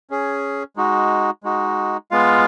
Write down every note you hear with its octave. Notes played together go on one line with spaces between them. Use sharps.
C#4 G#4
G#3 D#4 F#4
G#3 D#4 F#4
G#3 B3 F4 F5